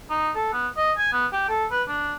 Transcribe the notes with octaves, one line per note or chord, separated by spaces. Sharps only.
D#4
A4
B3
D#5
G#5
B3
G4
A4
B4
D4